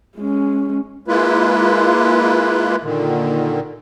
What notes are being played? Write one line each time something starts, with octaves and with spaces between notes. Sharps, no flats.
G#3 C#4
G#3 A#3 E4 F4 B4
A#2 D3 D#3